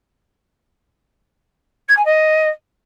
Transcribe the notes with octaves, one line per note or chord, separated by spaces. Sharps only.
G#6
G#5
D#5